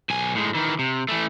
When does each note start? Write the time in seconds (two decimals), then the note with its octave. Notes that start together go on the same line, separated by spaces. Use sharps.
0.10 B1 G#5
0.35 A2 G#3
0.55 D#3 E3
0.79 C3
1.08 E3 A3